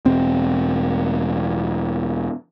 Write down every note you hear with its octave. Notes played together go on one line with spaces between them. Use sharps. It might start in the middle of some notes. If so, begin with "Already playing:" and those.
E1 C4